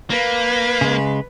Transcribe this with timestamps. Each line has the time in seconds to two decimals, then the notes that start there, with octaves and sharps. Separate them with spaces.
0.10 A#3 B4
0.81 C#3 G#3